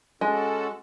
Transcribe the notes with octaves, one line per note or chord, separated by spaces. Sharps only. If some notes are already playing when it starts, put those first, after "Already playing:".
G#3 C#4 F#4 A4